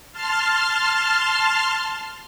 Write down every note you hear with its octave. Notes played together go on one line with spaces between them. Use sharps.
A5 C6 F6